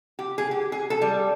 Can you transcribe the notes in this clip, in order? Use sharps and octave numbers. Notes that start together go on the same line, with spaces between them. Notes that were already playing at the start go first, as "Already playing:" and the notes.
G4
G#4
G4
G#4
A4
G3